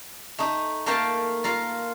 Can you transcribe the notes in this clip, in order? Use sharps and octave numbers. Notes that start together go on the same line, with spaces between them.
A3 D#4
A3 A#3 A#4 F5 G5 A5
F4 A#4 F5